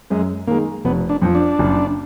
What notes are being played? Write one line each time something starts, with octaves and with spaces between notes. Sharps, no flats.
F#2 G#3
D#3 G#3 A#3
F1 B3
D4
F2 F3
D4
F#1